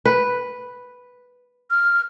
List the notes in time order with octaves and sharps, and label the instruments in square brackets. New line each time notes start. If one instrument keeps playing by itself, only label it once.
[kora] B4
[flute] F6